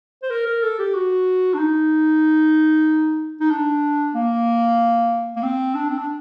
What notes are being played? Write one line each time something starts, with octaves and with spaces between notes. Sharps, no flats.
C5
A#4
A#4
A4
G4
F#4
D4
D#4
D#4
D4
A#3
A#3
C4
D4
C4
D4